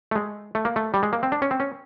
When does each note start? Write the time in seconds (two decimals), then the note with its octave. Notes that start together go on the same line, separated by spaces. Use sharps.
0.11 A3
0.15 G#3
0.55 A3
0.65 A#3
0.76 A3
0.94 G3
1.03 G#3
1.13 A#3
1.23 C4
1.32 D4
1.42 C#4
1.51 C4
1.60 C#4